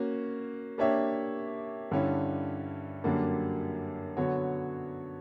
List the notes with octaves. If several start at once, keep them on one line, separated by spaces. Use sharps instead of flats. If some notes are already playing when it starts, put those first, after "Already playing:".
Already playing: A#3 C#4 F#4
A#3 D4 G4 C#5 E5
G2 D3 G3 C#4 E4
F#2 D3 G3 A#3 D4
D3 F#3 B3 F#4 C#5